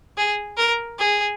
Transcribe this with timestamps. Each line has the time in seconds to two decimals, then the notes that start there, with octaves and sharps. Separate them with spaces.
0.17 G#4
0.57 A#4
0.99 G#4